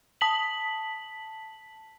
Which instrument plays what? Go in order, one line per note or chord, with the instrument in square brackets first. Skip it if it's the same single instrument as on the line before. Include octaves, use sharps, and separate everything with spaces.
[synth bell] A5 B6 F#7